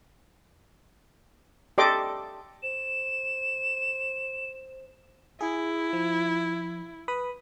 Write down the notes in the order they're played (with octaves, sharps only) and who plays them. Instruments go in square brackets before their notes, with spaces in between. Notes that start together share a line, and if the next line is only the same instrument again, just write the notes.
[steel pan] G4 A4 D5 D#5 C6 D6
[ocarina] C5 [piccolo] E7
[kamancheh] E4 [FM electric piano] G#4
[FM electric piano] F3
B4 B5 D#6